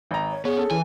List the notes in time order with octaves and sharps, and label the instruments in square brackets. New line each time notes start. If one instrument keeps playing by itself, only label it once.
[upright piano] G#1 A#5
[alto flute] C#5
[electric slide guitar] B3 [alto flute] G#4 [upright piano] C#5
[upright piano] C#4 A4
[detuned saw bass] E3 [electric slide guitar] G#5